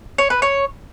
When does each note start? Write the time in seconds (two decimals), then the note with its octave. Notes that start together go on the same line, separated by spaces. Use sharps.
0.18 C#5
0.30 B4
0.42 C#5